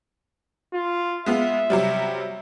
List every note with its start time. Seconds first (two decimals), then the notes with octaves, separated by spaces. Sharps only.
0.74 F4
1.26 G#3 B3 F4 E5
1.70 C3 F#3 G3